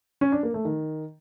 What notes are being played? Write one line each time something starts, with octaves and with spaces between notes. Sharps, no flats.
C#4
D4
A#3
A3
D#3